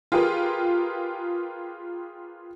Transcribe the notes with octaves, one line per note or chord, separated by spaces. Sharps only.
F4 G4 G#4 A#4 B4